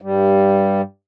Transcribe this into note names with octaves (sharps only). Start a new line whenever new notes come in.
G2 G3